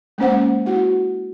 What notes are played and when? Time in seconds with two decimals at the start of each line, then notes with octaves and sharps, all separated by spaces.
0.18 G#3 A#3 C#4 C5 F#5
0.66 E4 F#4 F#5